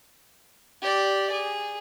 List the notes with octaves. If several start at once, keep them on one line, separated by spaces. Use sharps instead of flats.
G4 D5
G#4